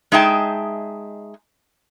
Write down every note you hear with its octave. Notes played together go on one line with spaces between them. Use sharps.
G#3 D#4 G#4 E5 G5 A5